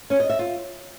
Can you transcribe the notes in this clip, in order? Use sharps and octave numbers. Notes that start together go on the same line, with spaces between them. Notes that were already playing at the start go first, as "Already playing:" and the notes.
C#4
D#5
E5
F4